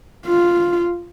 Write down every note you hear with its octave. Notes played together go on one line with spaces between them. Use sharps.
F4